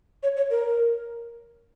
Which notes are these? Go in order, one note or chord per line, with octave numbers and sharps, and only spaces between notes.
C#5
C#5
A#4